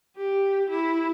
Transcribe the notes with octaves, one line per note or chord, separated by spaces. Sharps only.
G4
E4